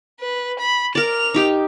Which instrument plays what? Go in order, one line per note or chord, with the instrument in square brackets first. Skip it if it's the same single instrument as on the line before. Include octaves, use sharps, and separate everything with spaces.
[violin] B4
B5
[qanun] A#4 D5 [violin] F7
[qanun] D#4 G4